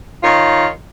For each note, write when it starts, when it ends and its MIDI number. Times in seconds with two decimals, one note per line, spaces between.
0.23 0.67 51
0.23 0.67 65
0.23 0.67 73